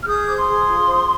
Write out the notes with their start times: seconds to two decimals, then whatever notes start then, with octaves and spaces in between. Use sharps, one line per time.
0.01 F6
0.07 G#4 D#6 G6
0.27 C5 D6
0.37 C6 D#6
0.47 G#4
0.67 F4
0.87 C5